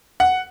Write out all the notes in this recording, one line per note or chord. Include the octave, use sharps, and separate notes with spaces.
F#5